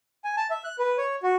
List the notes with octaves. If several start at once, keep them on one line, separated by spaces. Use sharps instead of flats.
G#5
A5
E5
F#6
B4
C#5
F#4